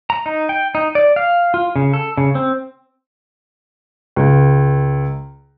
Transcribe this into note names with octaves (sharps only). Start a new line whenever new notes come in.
A#5
D#4
G5
D#4
D5
F5
F4
C#3
A4
C#3
C4
C#2